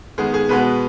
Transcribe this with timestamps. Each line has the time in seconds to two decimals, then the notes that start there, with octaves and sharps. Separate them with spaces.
0.18 D#3 G#3 B3 G#4
0.34 G#4
0.49 B2 G#3 B3 B4